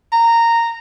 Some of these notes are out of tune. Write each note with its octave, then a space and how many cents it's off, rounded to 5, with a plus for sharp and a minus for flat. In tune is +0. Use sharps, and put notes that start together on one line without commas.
A#5 -10